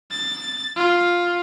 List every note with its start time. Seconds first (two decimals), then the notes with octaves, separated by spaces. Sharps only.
0.11 A6
0.76 F4